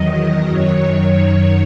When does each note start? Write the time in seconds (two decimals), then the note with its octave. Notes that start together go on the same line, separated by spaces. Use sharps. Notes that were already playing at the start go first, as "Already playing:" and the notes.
Already playing: E2 D#3 F#3 D#5
0.47 F#2 D#3 F#3 C#5